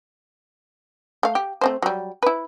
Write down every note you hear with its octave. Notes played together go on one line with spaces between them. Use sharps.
A3 F5
G4
A3 C4 C5
F#3 G3
E4 B4